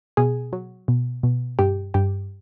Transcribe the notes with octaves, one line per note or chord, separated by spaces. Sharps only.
B2 G#4
F#3
B2
B2
G2 G4
G2 G4